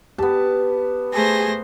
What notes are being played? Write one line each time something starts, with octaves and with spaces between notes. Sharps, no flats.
B3 G4 A5
A3 G#4 C5 A#6